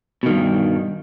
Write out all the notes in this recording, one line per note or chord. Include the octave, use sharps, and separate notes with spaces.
G2 B2 D#3